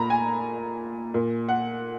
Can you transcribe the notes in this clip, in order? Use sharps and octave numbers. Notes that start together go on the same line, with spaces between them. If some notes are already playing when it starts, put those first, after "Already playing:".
Already playing: A#2 A#5 B5
G#5
A#2
F#5